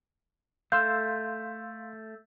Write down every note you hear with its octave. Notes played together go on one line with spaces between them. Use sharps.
A3 F5 C6 E6 G6